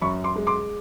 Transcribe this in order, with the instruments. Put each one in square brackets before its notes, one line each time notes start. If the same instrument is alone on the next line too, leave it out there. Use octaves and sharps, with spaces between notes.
[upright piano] F#2 B5 C#6
C6 D6
G#3
C6 D6